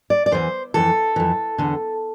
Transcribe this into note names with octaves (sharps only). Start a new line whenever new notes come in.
D5
D5
E2 E3 C5
F2 E3 A4
F2 E3
E2 D3